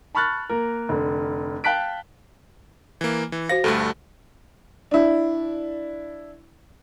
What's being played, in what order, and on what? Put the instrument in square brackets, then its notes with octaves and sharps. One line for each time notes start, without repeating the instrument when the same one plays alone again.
[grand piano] A5 B5 C#6 F6 F#6 A6
A#3 A#4
F1 D3
F5 G5 A5 F#6 B6 D7
[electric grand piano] E3 A#3
E3
[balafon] F#4 C5 F5 [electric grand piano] A#6
[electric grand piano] D2 G2 A3 [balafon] A4
[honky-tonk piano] D4 E4